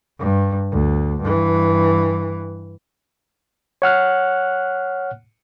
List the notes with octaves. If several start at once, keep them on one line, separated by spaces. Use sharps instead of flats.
G2
D2
G2 E3
C#5 F#5 F6 F#6